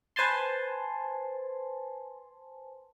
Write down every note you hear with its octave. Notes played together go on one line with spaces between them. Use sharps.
B4 C5 G#5 A5 C6